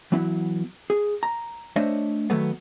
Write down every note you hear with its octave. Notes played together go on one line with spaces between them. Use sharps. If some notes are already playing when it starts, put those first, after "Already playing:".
E3 F#3 B3 E4
G#4
A#5
A3 D4 C5 C#5 D#5 E5
D#3 F#3 A3 B3